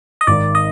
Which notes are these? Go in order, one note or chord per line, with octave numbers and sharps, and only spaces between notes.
D#5
G#1 G#2 D#3 D5
D#5